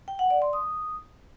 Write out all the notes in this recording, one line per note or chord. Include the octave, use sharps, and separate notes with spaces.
G5
F#5
D5
C6
D#6